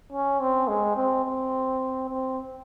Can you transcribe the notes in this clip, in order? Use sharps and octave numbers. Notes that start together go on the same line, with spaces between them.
C#4
C4
G#3
C4
C4
C4